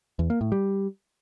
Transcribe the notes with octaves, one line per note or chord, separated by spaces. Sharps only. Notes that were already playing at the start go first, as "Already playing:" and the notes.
E2
A#3
A2
G3